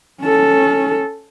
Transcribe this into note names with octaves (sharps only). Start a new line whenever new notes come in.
C#4 A4